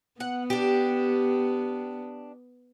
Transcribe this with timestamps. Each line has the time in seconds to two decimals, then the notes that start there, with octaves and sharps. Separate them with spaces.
0.20 B3 F#5
0.50 D4 G4